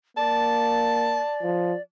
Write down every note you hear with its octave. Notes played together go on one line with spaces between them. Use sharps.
A#3 D5 A5
F3